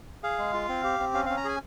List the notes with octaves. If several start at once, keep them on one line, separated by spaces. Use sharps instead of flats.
G#4 F5
G#3
F4
C4
G4
C4
C#4 F5
C#4 F5
A#5
G#4 G#5